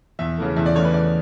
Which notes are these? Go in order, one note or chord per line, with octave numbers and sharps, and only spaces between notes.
E2 E5
C#3 E3 A3
E2 E5
D5
C#3 E3 A3 C#5
B4
E2 D5